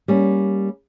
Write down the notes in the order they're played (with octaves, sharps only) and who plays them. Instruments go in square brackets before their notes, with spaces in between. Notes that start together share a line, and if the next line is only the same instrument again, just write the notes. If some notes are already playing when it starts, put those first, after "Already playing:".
[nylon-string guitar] G3 A#3 C#4